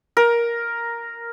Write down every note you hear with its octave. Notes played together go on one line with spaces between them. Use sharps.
A#4